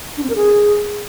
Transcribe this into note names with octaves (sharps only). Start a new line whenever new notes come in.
D4
C4
A#4
G#4